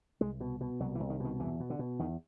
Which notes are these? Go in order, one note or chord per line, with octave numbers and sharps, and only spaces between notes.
C2 G#3
B2
B2
C2 F#3
E3
C2
D#3
B2 D#3
E2 E3
B2
D3
B2
E2 D#3